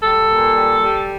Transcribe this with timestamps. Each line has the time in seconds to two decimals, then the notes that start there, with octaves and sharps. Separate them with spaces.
0.02 G3 A4
0.29 A#2
0.56 G3
0.83 G3